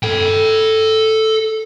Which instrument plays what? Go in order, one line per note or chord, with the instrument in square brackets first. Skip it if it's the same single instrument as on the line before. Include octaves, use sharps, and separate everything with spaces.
[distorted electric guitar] A4 G5